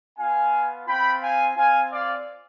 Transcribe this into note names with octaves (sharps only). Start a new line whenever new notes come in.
B3 F4 F5 G#5
C4 F4 G5 B5
F5 G#5
C4 F4 F5 G#5
D5 F5